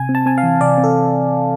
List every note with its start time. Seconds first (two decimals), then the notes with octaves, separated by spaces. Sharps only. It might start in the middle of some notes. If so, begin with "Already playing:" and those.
Already playing: C3 G#5
0.09 C4
0.15 A5
0.26 C4 G#5
0.38 F5
0.43 E3
0.61 C3 D5
0.78 C4
0.84 A4